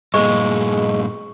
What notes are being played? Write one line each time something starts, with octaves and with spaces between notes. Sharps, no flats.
G2 A#2 G#3 C#6